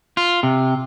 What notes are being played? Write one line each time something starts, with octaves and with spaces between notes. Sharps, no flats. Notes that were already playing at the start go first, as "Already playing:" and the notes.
F4
C3